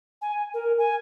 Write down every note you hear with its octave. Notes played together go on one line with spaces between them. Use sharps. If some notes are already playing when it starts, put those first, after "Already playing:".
G#5
A#4
G#5